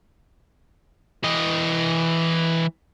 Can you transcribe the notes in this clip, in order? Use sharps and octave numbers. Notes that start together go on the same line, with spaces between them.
E3 D#5